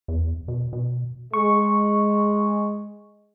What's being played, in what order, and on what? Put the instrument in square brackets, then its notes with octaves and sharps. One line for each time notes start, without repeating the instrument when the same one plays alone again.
[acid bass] E2
B2
B2
[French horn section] G#3 [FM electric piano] C#6